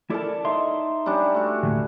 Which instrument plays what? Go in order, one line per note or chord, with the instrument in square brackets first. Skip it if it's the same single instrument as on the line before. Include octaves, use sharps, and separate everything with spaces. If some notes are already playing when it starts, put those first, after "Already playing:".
[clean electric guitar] E4 A4 A#4 [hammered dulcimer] D5 A5
[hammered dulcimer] D#4 [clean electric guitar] E5 C6
[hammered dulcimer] G3 C#4 D4
A3 F#4
[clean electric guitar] D2 A2 C3